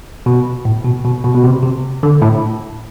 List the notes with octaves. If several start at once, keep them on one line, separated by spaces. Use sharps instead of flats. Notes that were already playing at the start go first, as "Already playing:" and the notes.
B2
A2
B2
B2
B2
B2
C3
C3
D3
A2